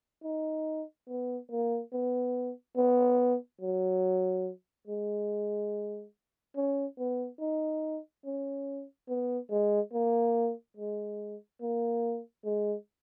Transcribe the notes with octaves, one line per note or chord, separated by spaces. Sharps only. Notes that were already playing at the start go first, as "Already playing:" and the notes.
D#4
B3
A#3
B3
B3
F#3
G#3
C#4
B3
D#4
C#4
B3
G#3
A#3
G#3
A#3
G#3